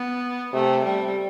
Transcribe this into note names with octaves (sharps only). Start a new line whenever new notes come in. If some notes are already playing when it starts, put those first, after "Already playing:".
Already playing: B3
C3 A3
G3